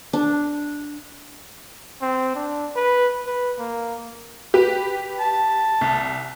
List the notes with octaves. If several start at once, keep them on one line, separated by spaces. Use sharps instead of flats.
D4
C4
D4
B4
B4
A#3
G4 B4
A5
C2